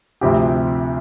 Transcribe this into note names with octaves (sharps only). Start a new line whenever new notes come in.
D2 C3 F3 C4 G4